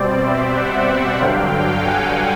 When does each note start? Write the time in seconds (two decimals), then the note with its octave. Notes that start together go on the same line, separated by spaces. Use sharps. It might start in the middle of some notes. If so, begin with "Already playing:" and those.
Already playing: B2 G3 C4 C5 D5
0.22 D5 E5
0.54 E5 F#5
1.19 G2 D3 F#3 F5 G5
1.83 F#5 G#5